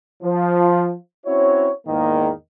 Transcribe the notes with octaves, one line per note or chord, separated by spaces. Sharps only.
F3
C4 C#4 E4 F#4 C#5
E2 G#2 D#3 A#3